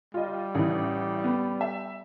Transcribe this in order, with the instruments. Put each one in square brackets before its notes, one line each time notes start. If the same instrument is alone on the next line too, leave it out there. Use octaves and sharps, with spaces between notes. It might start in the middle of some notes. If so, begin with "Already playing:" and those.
[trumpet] G3 [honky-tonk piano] F4 D#5
[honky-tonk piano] A1 E3
B3
E5